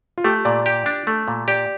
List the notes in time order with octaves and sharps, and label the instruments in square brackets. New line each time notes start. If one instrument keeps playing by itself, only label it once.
[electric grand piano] F4
[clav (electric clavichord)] A3 [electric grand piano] G4
[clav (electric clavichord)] A#2 [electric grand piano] D5
[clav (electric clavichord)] G4
D4
A3
A#2
[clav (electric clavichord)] G4 [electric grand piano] D5